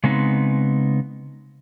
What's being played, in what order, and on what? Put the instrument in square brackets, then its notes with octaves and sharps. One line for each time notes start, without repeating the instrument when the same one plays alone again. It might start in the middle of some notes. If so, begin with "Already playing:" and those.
[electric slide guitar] C#3 G#3 B3 C4 D#4